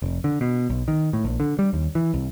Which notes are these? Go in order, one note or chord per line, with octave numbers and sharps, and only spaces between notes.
F1
D3
B2
B1
D#3
A2
A#1
D3
G3
D#2
E3
C2